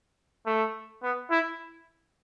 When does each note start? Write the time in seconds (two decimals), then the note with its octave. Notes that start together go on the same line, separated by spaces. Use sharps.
0.46 A3
1.03 B3
1.31 E4